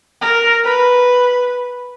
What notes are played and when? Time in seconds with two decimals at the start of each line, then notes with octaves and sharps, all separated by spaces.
0.21 A#4
0.64 B4